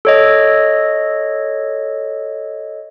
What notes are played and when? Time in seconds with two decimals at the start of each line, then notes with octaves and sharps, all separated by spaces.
0.05 A4 C#5 D#5